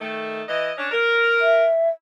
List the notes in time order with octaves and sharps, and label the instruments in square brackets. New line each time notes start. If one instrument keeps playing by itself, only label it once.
[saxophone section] D#3 A3
E3 E4 D#5
C#4 D4
A#4
[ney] E5